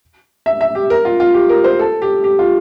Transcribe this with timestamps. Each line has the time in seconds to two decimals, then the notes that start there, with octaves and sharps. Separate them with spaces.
0.46 E5
0.61 E5
0.75 G4
0.90 A#4
1.05 F4
1.20 F4
1.34 G4
1.49 A#4
1.64 C5
1.79 A4
2.02 G4
2.24 G4
2.39 F4